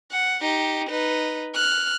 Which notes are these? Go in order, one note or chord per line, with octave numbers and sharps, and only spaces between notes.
F#5
D#4 G4
D#4 B4
F6 F#6